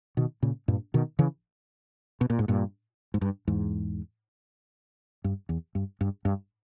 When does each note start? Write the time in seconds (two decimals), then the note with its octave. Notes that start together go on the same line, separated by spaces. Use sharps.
0.17 B2 D#3
0.43 A#2 C#3
0.68 G2 A#2
0.94 B2 D#3
1.19 C#3 E3
2.21 B2
2.30 A#2
2.39 G#2
2.48 G2 A#2
3.14 G#2
3.21 G2
3.48 E2 G#2
5.24 G2
5.49 E2
5.75 G2
6.01 G2
6.25 G2